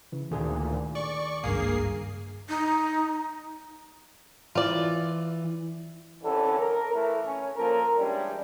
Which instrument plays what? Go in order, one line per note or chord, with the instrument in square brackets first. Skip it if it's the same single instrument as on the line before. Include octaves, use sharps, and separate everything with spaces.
[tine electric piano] C#3 E3
[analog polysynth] D2 A#2 [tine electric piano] D#3 G#4
[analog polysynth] D5 C#6
[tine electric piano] G#1 C#2 G2 [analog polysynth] A#3 G#4 C7
[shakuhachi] D#4
[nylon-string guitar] E3 [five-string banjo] F4 D5
[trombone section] C2 D3 E3 C#4 A4
A#4
E3 A3
C#4
F3 A#3 A4 A#4
E3 G3 G#3 C#4 D4